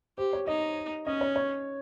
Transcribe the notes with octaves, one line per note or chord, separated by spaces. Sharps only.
G4 C5
C#5
D#4 D#5
C#4 D#5
C#5
C#5